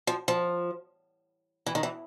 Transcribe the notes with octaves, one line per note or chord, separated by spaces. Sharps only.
F3
F3
E3
D#3
E3